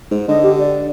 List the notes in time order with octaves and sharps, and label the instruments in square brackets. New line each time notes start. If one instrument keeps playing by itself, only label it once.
[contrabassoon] G#2
[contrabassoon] D3 [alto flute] D#5
[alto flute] G4
D5